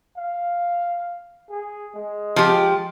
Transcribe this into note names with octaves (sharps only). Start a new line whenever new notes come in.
F5
G#4
G#3
F3 G4